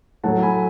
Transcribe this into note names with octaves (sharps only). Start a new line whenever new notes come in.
A2 F#3 A3 F#5 A5
G#5 B5